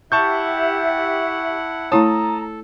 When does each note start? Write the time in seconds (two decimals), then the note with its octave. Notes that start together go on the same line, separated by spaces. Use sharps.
0.12 E4 G4 E5 F#5 A5 C#6 G6
1.92 A3 E4 A4 C#5 A5 A#5 D#6